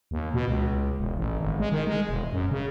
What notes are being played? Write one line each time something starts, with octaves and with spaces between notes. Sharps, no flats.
D#2
B2
C#2
E1
A1
G#1
G#3
D#3
G#3
E1
F#2
C#3